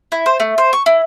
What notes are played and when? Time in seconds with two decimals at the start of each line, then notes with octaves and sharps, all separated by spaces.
0.12 E4
0.26 C5
0.40 A3
0.58 C5
0.73 C#6
0.86 E4